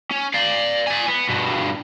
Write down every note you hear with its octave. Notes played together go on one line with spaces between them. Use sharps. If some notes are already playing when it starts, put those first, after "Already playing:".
C#4
D5 F5
D5 G#5
B3
G2 B2